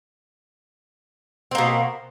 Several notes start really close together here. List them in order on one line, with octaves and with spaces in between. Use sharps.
C4 A#3 B2